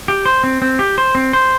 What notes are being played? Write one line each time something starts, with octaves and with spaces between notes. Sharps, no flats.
G4
C5
C4
C4
G4
C5
C4
C5